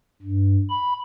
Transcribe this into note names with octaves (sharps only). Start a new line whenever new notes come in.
G2
B5